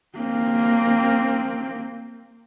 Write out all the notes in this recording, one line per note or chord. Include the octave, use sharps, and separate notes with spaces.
A#3 C4